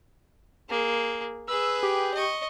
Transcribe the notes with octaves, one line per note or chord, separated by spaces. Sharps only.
A#3 G#4
G#4 B4 E6
G4
D#5 C#6